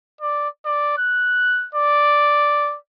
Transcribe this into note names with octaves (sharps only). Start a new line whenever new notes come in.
D5
D5
F#6
D5